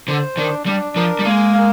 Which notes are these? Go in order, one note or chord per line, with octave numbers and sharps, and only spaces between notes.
D3 C5
D#3 D4
G3 D4
F3 A#4
G3
G#3 A#3
F5